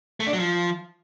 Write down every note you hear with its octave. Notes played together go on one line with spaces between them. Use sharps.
A3
D4
F#3
F3